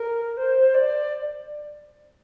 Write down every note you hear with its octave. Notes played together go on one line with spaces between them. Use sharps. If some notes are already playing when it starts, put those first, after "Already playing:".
Already playing: A#4
C5
D5